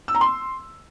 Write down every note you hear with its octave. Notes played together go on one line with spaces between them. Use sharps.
E6
A#5
C6